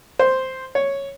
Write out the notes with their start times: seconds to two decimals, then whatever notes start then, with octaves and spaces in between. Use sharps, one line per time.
0.19 C5
0.75 C#5